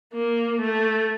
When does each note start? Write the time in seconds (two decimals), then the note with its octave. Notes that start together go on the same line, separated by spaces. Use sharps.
0.14 A#3
0.61 A3